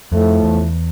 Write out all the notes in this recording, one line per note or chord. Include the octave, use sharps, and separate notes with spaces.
F2 A2 F3 A3
E2